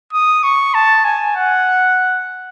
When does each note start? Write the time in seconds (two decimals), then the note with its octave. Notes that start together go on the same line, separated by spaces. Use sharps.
0.13 D#6
0.43 C#6
0.74 A5
1.04 G#5
1.36 F#5